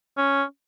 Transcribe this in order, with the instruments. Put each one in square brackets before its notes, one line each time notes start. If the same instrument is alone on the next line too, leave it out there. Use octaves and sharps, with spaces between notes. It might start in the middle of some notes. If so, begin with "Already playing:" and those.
[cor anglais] C#4